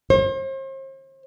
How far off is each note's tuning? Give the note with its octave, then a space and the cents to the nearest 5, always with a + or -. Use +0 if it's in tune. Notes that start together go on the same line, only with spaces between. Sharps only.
C5 +40